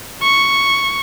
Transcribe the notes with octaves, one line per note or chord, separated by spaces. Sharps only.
C#6